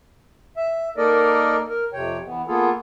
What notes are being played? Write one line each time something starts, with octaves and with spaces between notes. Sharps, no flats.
E5
A#3 D#4 A4 A#4 D5 D#5
A#4
F2 C3 C#5 G5
E3 B3
A#3 B3 F4 G#4 A4